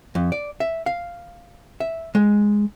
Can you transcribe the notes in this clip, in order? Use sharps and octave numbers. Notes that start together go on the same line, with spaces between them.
F2
D5
E5
F5
E5
G#3